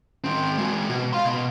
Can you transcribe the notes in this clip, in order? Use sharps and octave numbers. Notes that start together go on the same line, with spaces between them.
D#3 C4
G#3 F#4
B2
F5 C6
B2